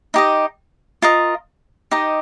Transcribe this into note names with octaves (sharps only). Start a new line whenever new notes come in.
D#4 G4 D#5
F4 A#4 D#5
D#4 G4 D#5